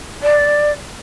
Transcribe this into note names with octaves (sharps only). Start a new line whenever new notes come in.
D5